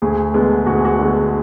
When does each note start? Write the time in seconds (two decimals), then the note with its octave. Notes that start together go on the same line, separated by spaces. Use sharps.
0.02 D2 G#4
0.34 D3 G#3 B3
0.66 D2 F#4
0.75 G#4
0.85 F#4
0.99 D3 G#3 B3